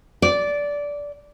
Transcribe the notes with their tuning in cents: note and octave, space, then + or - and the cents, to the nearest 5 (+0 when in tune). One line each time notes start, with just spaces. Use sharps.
D5 -15